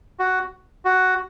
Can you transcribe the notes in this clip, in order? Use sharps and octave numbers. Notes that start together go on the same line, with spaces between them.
F#4
F#4